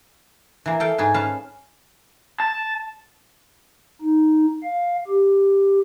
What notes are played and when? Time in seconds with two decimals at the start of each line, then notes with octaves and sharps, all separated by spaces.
0.66 E3 A#3
0.80 A4 F5 G5
0.98 G#2 G#4 B4
1.14 C#4 B4 F5 A5
2.40 A5
4.02 D#4
4.63 F5
5.08 G4